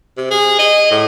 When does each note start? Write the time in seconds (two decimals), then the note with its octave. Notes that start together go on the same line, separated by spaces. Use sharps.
0.17 C3
0.31 G#4
0.59 D#5
0.91 A2